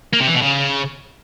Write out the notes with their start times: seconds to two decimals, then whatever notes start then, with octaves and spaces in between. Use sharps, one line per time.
0.13 A#3
0.20 C3
0.27 E3
0.34 B2
0.41 C#3